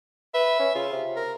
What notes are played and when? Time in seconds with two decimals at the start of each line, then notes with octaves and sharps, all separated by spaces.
0.34 B4 E5
0.60 C#4
0.75 C#3 F4
0.92 C3
1.16 A#4